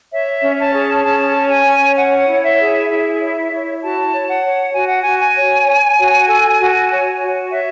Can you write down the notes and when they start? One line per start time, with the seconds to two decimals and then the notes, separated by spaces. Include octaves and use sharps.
0.12 C#5 E5
0.43 C#4
0.58 A5
0.73 G#4
1.04 C#4 A5
1.35 C#5
1.51 G#5
1.66 C#4
1.97 C#5 F#5
2.28 E4
2.43 E5
2.59 G#4
2.89 E4 E5
3.20 C#5
3.51 E4
3.82 F#4 A5
4.13 C#5
4.28 F#5
4.44 C#5
4.74 F#4 G#5
4.87 F#5
5.01 F#4 G#5
5.21 G#5
5.36 C#5
5.67 C#5
5.98 F#4
6.29 A4
6.60 F#4
6.90 C#5
7.22 F#4
7.52 C#5 E5